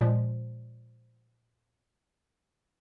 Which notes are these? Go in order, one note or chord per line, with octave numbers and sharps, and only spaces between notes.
A#2 F3 G#3